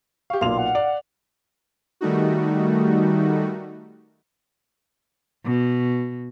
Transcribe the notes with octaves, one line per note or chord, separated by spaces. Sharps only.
G4 F5 C#6
B1 A#2 F5 C6 F7
F#5
D5
D#3 G3 A3 D#4 F#4
B2